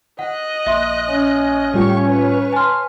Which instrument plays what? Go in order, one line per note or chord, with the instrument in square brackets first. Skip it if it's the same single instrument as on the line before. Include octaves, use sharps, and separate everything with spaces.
[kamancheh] D#5 F#6 [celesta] F#5
[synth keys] A#1 [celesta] E5 C6
[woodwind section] C#4
[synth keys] A2 G3 F4 [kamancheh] G4 C#6
[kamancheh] B4 C#5
[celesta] G#5 F6 [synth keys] A5 C6